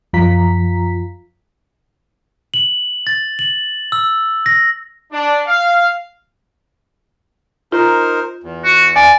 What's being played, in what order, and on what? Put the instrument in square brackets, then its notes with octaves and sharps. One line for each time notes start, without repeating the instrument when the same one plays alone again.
[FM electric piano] F#2 F3 F4 A#5 B6
[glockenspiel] F#7
A6
F#7
E6
A#6
[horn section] D4
F5
[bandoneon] D#4 A#4 C5 [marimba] F4
[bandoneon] E2
[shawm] F#4
[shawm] D5 [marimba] G#5